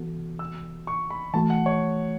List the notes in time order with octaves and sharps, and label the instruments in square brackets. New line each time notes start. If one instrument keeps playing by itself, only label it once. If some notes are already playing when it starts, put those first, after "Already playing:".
Already playing: [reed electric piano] E3 B3 F#4 A4
[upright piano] E6
C#6
B5
[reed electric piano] E3 A3 F#4 [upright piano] A5
[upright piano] F#5
C#5